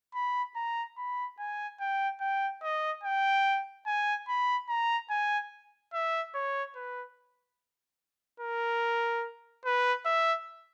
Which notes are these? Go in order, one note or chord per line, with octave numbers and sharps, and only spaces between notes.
B5
A#5
B5
G#5
G5
G5
D#5
G5
G#5
B5
A#5
G#5
E5
C#5
B4
A#4
B4
E5